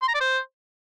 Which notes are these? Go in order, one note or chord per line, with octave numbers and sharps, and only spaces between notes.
C6
A#5
D5
C5